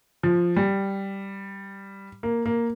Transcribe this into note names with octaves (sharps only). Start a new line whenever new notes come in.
F3
G3
A#3
A#3